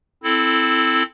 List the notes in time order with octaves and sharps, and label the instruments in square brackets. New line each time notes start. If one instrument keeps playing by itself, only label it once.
[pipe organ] C4 E4 A4